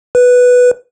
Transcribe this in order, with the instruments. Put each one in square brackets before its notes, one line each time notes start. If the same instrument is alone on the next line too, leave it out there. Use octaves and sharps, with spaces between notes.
[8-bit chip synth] B4